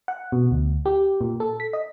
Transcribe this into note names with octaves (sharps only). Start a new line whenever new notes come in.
F#5
B2
D2
G4
A#2
A4
B6
D#5